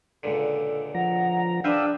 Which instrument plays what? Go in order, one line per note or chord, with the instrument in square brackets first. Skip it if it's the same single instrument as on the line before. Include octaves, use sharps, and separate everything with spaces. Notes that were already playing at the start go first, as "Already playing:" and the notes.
[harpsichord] C#2 A#2 D3 [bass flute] A4
[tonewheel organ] F3 A#5 [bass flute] F#5
[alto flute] D4 [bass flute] G#4 [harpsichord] B4 C5 E5 [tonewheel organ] F5 G5 E6